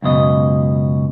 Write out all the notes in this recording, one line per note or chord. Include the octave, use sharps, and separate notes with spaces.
C#2 F#2 B2 D#5